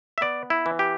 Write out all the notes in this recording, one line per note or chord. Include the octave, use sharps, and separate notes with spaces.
E5
B3 D5
E4
E3
G4